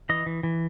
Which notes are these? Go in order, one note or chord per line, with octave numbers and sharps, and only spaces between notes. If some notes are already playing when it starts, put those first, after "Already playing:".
E3 D#5
E3
E3